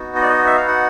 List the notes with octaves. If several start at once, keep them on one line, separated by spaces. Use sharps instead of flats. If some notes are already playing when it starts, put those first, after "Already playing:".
Already playing: B3 D#4 F#4
D#5
D5
D#5
E5
F5
F#5